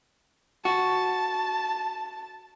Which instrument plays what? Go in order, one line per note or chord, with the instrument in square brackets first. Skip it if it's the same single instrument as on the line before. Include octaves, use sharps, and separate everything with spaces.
[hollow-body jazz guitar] F#4 [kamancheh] A5